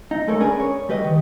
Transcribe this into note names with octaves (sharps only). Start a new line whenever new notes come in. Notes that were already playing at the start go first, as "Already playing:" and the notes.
D#4
G#3 A3 A4 A#4 C#5
C#4 D4 G#4 A#4 B4
C#5
G3 G4 B4 D#5
D#3